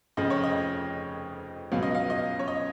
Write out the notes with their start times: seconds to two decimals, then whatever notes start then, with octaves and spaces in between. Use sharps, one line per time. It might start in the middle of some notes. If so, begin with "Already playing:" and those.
0.17 F1 F2 C#3 F3 D#5
0.30 C#5
0.44 D#5
1.72 C#2 B2 F#3 C#4 F5
1.83 D#5
1.95 F5
2.10 D#5
2.39 C#5
2.48 D#5